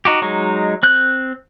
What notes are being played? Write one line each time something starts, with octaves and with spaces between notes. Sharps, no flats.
D#4 F#4 G4
F#3 G#3 D#4
C4 F#6 G6